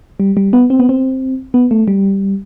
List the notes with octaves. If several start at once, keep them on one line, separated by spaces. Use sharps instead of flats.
G3
G3
B3
C4
B3
C4
B3
A3
G3